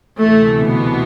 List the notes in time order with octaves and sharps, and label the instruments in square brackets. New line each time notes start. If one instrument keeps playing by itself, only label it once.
[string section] D2 C3 E3 A3
B2 B3